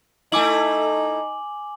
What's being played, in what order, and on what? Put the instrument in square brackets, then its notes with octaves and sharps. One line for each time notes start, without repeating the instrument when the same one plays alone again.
[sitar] A3 E4 [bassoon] D#4 [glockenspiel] G#5 D6 F#7